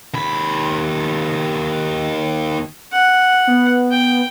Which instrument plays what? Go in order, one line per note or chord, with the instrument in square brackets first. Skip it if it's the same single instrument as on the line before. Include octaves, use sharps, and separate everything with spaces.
[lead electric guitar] D#2 B5
[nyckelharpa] F#5
[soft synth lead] B3
[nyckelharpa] G5